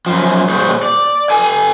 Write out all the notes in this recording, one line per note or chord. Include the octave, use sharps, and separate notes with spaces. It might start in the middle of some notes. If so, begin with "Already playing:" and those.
F#2 F3
A#2 G3 G#4 C5 C#5
D5
A4 G#5